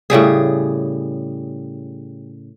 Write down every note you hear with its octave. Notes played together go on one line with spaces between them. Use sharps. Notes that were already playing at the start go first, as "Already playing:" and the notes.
A2 C#3 G3 G#4